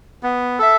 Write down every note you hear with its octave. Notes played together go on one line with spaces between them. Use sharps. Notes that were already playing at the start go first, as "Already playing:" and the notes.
B3
A4 E5